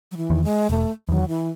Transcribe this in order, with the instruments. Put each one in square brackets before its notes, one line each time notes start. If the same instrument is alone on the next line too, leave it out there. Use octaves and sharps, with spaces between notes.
[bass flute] F#3
E3
[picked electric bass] E2 D#3
[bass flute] G#3
[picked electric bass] E1 [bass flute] A3
[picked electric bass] E2 D#3 [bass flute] F#3
[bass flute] E3